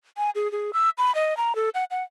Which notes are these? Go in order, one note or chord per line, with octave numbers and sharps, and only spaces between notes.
G#5
G#4
G#4
E6
B5
D#5
A#5
A4
F#5
F#5